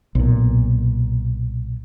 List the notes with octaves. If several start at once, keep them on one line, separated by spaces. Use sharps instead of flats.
B1 A#2